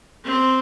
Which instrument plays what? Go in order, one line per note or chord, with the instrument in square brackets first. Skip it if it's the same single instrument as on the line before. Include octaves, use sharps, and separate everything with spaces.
[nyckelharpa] C4